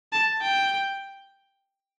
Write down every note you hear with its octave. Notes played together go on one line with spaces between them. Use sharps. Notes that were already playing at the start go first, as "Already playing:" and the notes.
A5
G5